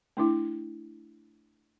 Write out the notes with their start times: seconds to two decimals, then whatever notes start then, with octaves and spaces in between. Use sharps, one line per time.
0.17 A3 D4 E4